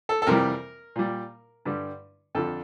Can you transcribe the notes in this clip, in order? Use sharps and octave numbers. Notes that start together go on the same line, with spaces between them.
A4
A4
F2 C3 E3 G3 A#4
A#2 G3
G2 D3 G3
F2 D3 F3 A4